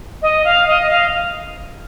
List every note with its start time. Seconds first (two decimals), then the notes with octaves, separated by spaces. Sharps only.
0.22 D#5
0.45 F5
0.67 D#5
0.90 F5